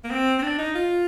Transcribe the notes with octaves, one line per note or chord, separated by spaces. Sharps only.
A#3
C4
C4
D4
D#4
F4